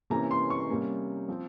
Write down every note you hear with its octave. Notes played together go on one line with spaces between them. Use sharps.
C3 E3 A#3 C#4 A#5
C6
C#6
C3 G3 A#3 C#4
F3 C4